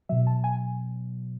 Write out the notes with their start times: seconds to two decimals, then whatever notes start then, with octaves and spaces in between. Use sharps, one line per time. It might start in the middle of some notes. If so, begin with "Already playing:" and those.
0.09 B2 F#3 E5
0.27 A5
0.44 G#5